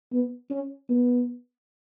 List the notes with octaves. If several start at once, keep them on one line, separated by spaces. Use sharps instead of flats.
B3
C#4
B3